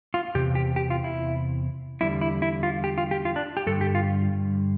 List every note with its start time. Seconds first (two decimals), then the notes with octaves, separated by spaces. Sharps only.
0.14 F4
0.35 E2 C3 G4
0.55 G4
0.76 G4
0.90 F4
1.04 E4
2.01 E2 D3 G3 E4
2.21 E4
2.42 E4
2.63 F4
2.84 G4
2.98 F4
3.11 G4
3.25 F4
3.36 D4
3.57 G4
3.66 G2 D3 G3 A4
3.81 G4
3.95 F4